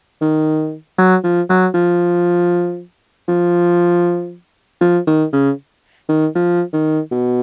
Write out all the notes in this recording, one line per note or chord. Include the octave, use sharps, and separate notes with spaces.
D#3
F#3
F3
F#3
F3
F3
F3
D#3
C#3
D#3
F3
D#3
B2